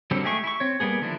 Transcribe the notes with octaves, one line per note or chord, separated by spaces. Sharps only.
D3 F#3 G3 C4
G#3 A3 G4 G#4 C#6
E4 C#6
C4 C#5
G3 A#3 B3 G#4
D3 D#3 F3 D4 E4